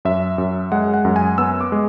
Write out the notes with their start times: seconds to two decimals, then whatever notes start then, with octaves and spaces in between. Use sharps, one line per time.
0.05 F#2 E5
0.38 F#2
0.72 G#3 F#5
0.94 F#5
1.05 F#2
1.16 G#5
1.38 B3 E6
1.61 D6
1.72 G#3